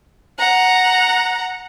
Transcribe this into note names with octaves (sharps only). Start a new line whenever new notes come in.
F#5 A#5